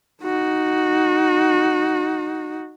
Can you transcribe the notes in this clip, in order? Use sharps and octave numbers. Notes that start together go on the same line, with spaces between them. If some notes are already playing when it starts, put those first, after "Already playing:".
D#4 F#4